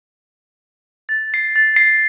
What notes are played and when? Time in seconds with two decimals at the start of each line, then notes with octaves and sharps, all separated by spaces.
1.09 A6
1.34 C7
1.56 A6
1.76 C7